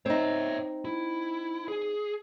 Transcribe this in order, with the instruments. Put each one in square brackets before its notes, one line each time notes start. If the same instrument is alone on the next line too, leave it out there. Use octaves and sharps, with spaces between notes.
[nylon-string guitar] C4 D#4 [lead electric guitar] C#5 E5
[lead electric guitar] E4
G#4